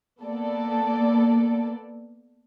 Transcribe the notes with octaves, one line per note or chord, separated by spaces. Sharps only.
A#3 B3 A4 D5